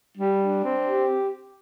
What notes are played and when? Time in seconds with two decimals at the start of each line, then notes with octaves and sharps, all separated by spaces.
0.16 G3
0.39 D4
0.63 C4
0.85 G4